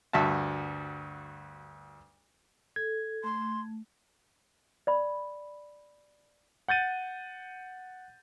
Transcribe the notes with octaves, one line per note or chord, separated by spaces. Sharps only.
D2 G2 F#4 E5 A5
A4 G#6
A3 C6
D5 B5
F#5 G6 A6 D#7